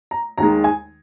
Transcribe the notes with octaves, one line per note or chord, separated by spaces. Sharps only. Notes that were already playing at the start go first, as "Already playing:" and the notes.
A#5
D#2 D#3 G#3 A#5
G#5